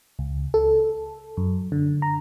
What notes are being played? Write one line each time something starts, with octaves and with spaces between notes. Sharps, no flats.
C#2
A4
F#2
D3
A#5